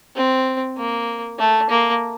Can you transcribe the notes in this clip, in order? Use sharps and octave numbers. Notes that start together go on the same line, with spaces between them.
C4
A#3
A3
A#3